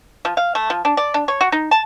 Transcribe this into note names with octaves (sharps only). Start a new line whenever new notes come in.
F3
F5
A3
F3
D4
D5
D4
C#5
F#4
D#4
A5